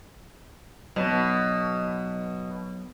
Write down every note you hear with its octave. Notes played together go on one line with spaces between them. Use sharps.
B2 F#3 B3